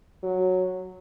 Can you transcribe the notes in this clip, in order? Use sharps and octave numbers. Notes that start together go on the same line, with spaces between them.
F#3